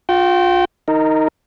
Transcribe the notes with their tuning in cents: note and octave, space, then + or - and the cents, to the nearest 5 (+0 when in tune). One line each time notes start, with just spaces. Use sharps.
F4 +30 G5 -25
D#4 +10 A#4 -25